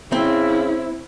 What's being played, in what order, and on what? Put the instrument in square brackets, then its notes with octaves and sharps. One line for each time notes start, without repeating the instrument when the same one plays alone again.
[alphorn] C#3 [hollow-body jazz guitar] C4 [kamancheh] E4